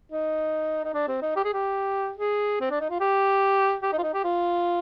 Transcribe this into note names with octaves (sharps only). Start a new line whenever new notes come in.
D#4
D#4
D4
C4
D#4
G4
G#4
G4
G#4
C4
D4
D#4
F4
G4
G4
D#4
F4
D#4
G4
F4